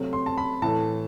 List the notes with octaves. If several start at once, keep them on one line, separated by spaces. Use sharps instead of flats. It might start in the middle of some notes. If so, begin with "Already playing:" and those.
Already playing: C3 F#3 A3 C4
C6
A5
B5
A2 E3 A3 A5